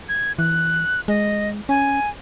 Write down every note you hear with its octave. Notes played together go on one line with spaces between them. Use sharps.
G#6
E3 F#6
G#3 D#5
C#4 G#5